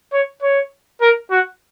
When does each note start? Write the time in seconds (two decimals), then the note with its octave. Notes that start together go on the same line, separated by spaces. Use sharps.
0.13 C#5
0.42 C#5
1.01 A#4
1.31 F#4